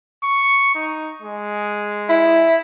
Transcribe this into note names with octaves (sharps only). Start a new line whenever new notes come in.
C#6
D#4
G#3
E4